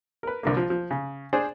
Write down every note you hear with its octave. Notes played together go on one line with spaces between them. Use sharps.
A#4 B4
C2 D3 A#3
F3
F3
C#3
D4 G#4 C5